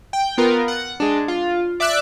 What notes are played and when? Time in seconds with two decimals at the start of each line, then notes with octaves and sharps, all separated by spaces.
0.13 G5
0.38 B3 F4 A#4
0.68 F#5
1.00 G#3 D4
1.28 F4
1.80 D5 E5 D6 E6 F#6